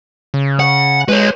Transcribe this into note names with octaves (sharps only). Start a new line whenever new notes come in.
C#3
F#5
G#3 B4 C#5